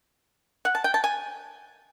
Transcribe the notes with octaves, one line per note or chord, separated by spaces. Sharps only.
F#5
A5
G5
A5
G#5